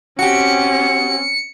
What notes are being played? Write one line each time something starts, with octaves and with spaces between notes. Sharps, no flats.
C4 C#4 F#4 G4 C#7